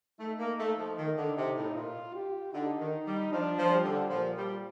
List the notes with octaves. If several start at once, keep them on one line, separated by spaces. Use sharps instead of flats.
A3 D#4
A#3
A3
F3
D#3
D3
C3
A2
A#2 F4
G4
D3 D#4
D#3
G3
F3 D4
F3
G3
D3
A#2 F3
G3